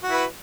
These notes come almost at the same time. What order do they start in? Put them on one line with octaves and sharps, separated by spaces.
F#4 E4 B4